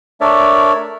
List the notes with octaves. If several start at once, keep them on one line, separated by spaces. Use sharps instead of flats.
A3 D4 A#4 C#5 D5 E5